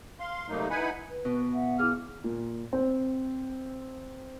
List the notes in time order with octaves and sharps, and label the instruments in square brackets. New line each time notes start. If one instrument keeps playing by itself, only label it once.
[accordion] F5 C6
C3 F#3 G3 A3 A#3 D#4
D#4 E4 B4 F#5 G#5 B5
[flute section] B4
[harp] B2
[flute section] E5 F#5
[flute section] E4 D6 F6 [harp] G#4 F5
[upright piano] A#2
C4